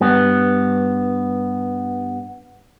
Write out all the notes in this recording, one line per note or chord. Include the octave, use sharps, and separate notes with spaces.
G2 B3